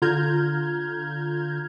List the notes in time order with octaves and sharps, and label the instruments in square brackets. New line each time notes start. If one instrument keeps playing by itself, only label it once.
[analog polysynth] D3 F4 A#5 F6 G6 G#6